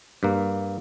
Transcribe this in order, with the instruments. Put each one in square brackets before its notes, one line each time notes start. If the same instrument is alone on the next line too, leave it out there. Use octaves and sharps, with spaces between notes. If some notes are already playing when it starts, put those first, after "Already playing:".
[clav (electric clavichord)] G2 A#3